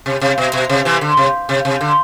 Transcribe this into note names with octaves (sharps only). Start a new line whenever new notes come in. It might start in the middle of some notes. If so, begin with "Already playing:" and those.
C3
C3
B2
B2
C3
C3 E3
D3
C3
C3
C3
D3